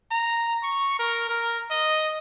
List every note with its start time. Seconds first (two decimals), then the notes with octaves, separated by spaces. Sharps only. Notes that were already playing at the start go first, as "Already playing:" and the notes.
0.11 A#5
0.63 C#6
0.99 A#4
1.29 A#4
1.71 D#5